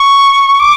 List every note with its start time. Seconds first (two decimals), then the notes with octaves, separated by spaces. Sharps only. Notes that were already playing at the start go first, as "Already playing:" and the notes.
Already playing: C#6
0.60 D6